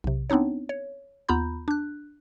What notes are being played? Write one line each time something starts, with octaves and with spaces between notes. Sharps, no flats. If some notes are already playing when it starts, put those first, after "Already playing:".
B1 C3
B3 C4 D4 D#4 C#5
C#5
D#2 B3 F4 A#5 B5 G6
D4 F#6